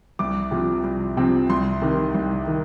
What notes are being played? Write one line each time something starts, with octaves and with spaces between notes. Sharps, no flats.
C2 D6
C3 F3 C4
C2
C3 F3 C4
C2 C6
C3 D#3
C2
D#3